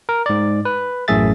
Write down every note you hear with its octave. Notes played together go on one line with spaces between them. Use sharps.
A#4
G#2 D5
B4
A1 F#2 A2 G#4 E5 A6